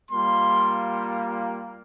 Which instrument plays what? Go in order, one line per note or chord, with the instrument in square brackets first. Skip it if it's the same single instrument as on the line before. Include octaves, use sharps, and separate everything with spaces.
[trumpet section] G3 A#3 F4 C6